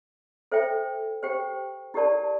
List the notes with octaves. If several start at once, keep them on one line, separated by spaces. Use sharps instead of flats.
A4 C5 E5 G5
G4 C5 G5
E4 G4 A#4 D5 A5